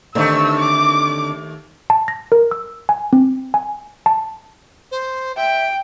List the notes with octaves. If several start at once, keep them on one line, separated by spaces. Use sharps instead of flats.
D#2 D3 A3 C4 D#4 E6
D6
A5
A#6
A#4
E6
G#5
C4
G#5
A5
C5
E5 G5